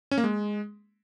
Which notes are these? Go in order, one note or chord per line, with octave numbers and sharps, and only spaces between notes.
C#4
A#3
G#3